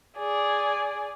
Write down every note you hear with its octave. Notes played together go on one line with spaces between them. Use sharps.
G#4 D5